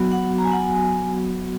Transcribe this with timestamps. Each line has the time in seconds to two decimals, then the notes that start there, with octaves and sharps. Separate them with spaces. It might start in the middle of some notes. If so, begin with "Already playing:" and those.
Already playing: F#3 B3 F#4
0.12 F#5
0.38 A#5
0.44 G#5
0.52 F#5
0.59 G#5